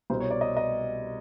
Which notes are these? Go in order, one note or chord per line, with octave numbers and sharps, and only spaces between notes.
C2 B2 C5
C#5
D5
D#5
D#5